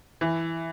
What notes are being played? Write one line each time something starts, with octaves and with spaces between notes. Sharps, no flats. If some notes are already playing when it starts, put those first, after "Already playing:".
E3